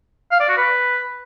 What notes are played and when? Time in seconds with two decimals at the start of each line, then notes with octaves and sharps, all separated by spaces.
0.31 F5
0.40 D5
0.49 F#4
0.57 B4